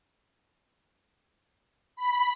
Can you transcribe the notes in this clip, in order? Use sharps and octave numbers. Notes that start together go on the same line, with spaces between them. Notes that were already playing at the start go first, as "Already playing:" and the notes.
B5